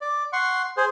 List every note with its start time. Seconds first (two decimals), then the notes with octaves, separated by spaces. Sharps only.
0.01 D5
0.33 F#5 C6 C#6
0.77 G#4 C5